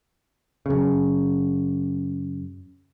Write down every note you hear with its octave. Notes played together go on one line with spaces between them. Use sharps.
F#2 C#3